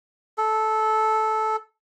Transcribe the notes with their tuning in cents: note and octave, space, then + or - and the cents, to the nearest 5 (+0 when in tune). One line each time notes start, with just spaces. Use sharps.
A4 -15